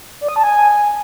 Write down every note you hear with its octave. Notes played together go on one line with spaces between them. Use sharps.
D5
D#6
A5
G#5